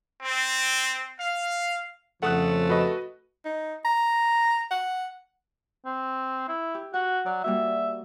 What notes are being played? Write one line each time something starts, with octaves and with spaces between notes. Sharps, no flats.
C4
F5
F2 C#3 F3 A3 F#5 D#6 F#6
F#4 B4 D#5
D#4
A#5
F#5
C4
E4
G4
F#4 F#5
F#3 D5
G3 A#3 F#4 E5